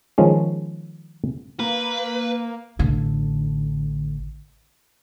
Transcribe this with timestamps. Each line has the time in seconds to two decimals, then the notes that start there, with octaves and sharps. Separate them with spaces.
0.18 D#3 F3 G#3 C#4
1.60 A#3 B4
2.79 A1 D3